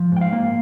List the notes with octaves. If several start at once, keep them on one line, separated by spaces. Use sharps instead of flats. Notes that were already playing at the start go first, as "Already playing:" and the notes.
Already playing: F3
G#2 G5
F5
A#3